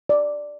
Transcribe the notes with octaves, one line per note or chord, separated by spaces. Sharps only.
D5